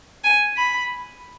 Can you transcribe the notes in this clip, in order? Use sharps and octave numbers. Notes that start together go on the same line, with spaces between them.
G#5
B5